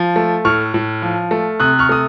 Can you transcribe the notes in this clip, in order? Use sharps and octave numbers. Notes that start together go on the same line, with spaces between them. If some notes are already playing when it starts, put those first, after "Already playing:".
Already playing: F3
A3
A2 C#6 F6
A2
F3
A3
C3 D#6 F#6
C#6 F6
A3 D#6